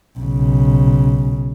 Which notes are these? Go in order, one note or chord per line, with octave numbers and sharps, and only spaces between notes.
B1 C#3